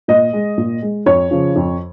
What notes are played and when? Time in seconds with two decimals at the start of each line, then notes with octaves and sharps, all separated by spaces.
0.08 A#2 D#5
0.33 G#3
0.58 A#2
0.82 G#3
1.06 F2 C#5
1.31 C#3 F3
1.56 F2